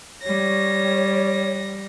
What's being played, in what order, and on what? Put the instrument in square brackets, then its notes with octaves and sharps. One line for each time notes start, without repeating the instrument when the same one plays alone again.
[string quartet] G3 A#6 [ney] C#5